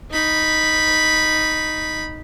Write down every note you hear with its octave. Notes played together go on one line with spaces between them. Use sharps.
D#4 B5